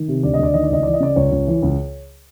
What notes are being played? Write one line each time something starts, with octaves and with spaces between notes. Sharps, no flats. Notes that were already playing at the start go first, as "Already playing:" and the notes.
Already playing: D#3
C3
D2 D5
D#5
D2 D5
D#3 D#5
D5
C#2 D#5
E3 D5
D#5
C#3 D5
C#2 C#5
C#2
E3
C#2